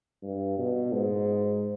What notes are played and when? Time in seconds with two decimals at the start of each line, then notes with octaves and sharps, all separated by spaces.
0.23 G2
0.58 B2
0.92 G#2